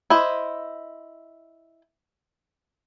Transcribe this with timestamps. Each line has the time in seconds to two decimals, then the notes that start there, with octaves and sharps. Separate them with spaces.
0.10 E4 C5 D#5